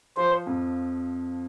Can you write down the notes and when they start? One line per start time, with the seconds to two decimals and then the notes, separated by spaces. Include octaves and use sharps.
0.17 F3 C5
0.47 F2